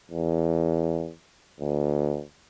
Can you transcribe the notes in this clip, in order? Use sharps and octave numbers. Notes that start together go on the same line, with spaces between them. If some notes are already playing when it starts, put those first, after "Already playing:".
E2
D2